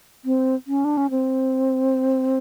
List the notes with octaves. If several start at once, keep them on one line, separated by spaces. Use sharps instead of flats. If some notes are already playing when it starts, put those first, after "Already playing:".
C4
C#4
D4
C#4
C4